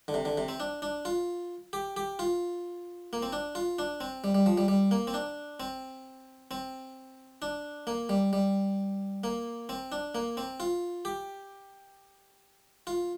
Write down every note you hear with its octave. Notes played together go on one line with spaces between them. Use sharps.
D3
C3
D3
C3
C4
D4
D4
F4
G4
G4
F4
A#3
C4
D4
F4
D4
C4
G3
G3
F3
G3
G3
A#3
C4
D4
C4
C4
D4
A#3
G3
G3
A#3
C4
D4
A#3
C4
F4
G4
F4